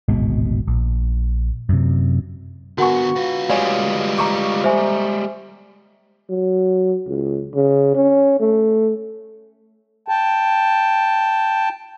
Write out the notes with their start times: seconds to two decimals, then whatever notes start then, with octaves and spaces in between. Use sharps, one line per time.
0.08 D1 G#1 B2 G#3
0.67 A#1
1.69 F#2 C3
2.78 D3 B3 F#4 A#4 F#5 G#5 C#6
3.16 F4 B4
3.49 G3 G#3 C#5 F5 G#5
4.17 A#5 C#6 D6
4.64 C5 E5 G#5
6.29 F#3
7.07 C#2
7.54 C#3
7.95 C#4
8.40 A3
10.08 G5 A5